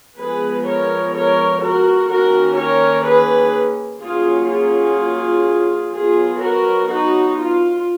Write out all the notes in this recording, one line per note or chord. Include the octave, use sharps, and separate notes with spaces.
F3 G#3 B3 G#4 B4
A#4 C#5
A#4 C#5
F#4 A#4
D#3 A#3 C#4 F#4 A#4
A#4 C#5
G#4 B4
F#3 A#3 C#4 F4 G#4
F4 G#4
F#3 B3 F4 G#4
F#4 A#4
D#4 F#4
F4